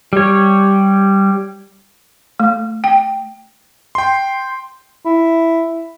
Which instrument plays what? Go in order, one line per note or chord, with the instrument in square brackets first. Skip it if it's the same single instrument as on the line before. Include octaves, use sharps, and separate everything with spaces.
[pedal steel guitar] G3 C#5
[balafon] A3
G5
[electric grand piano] G5 C6
[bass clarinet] E4